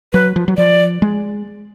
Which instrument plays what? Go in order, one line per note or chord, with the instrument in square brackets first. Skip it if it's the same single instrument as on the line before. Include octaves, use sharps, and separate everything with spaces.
[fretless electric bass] F#3 [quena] B4
[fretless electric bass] F3
F#3
[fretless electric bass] F3 [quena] D5
[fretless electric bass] G#3